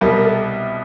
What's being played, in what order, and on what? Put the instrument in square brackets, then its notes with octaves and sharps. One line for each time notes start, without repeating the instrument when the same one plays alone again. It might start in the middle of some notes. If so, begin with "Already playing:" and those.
[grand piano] C2 B2 G3 [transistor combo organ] A#4
[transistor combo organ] A#4
A4